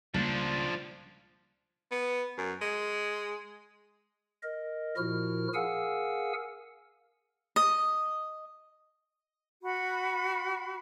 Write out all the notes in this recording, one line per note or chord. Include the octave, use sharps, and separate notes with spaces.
C#2 F3 G3 A#3 D4
B3
F#2
G#3
A#4 D#5
A#2 F3 E4 F#4 A#4 F6
G#4 A#4 F5 F#5 G#5 E6
D#5
F#4 B5